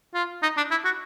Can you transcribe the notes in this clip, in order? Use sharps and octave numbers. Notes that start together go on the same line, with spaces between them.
F4
D#4
D4
E4
F#4